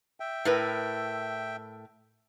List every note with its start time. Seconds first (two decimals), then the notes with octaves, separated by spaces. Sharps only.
0.20 E5 G5
0.45 A2 A#4 B4